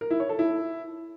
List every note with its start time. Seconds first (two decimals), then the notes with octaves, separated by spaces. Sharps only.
0.01 A#4
0.11 E4
0.20 C#5
0.29 A4
0.39 E4